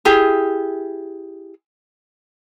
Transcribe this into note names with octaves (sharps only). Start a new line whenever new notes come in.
E4 G4 G#4